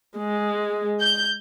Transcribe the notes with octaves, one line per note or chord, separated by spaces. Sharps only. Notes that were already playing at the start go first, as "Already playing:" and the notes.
G#3
G6